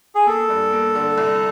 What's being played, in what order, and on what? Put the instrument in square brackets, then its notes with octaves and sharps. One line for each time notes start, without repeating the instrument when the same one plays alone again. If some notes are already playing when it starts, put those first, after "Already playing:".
[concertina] G#4
[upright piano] A#3 [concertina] A4
[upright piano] G2
A#3
D3
C2